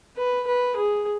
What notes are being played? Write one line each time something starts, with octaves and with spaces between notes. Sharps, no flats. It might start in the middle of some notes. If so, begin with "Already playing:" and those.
B4
B4
G#4